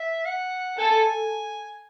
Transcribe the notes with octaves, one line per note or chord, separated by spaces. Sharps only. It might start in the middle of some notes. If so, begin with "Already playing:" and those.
Already playing: E5
F#5
A4 G#5